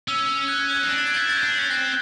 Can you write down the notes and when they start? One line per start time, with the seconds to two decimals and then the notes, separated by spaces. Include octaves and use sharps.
0.08 C#4 E6
0.48 F#6 G#6
0.83 D#4
0.89 D4 A#6
0.98 A6
1.07 G#6
1.14 E4 G6 A6
1.29 G6 A6
1.37 C#4
1.43 D4
1.59 C#4
1.70 C4 F#6 G#6